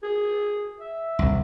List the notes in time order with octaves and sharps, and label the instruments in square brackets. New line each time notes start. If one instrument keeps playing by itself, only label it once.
[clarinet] G#4
E5
[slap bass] D#1 C2